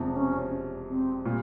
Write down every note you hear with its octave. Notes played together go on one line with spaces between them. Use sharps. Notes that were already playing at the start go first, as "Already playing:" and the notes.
Already playing: E1 E2 C3 F3
C4
C#4
C4
A#2 G3